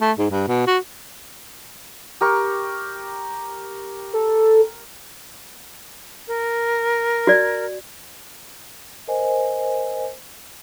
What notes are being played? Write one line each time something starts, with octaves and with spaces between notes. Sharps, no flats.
A3
G#2
G2
B2
F#4
G4 A#4 C#6
A4
A#4
F#4 D5
A#4 C5 D#5 G#5